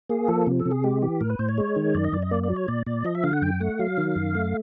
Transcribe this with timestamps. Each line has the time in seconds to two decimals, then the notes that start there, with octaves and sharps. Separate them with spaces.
0.10 A#3 G#4
0.28 F3 A4
0.47 C3
0.60 A4
0.66 C3
0.71 G#4
0.84 G#3 G4
1.02 E3 G4
1.21 A2 A#4
1.30 B4
1.39 A2 C5
1.49 C#5
1.58 G#3
1.76 D#3
1.94 F#2 D5
2.04 D#5
2.13 F#2 D5
2.22 D#5
2.31 A#3 D5
2.43 D5
2.50 F#3
2.56 C#5
2.68 A#2 D5
2.86 A#2 D5
3.05 F3 D#5
3.15 E5
3.24 D3 F5
3.33 F#5
3.42 F#2 G5
3.60 A3 F#5
3.79 F#3 F5
3.98 D#3
4.16 F#2
4.35 A3